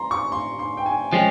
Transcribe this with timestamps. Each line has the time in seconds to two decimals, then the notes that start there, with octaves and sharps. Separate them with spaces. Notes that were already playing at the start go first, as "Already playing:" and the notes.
Already playing: A#5 C6
0.11 C#6
0.32 C6
0.59 C6
0.77 G5
0.86 G#5
1.12 F3 G#3 C#4 G5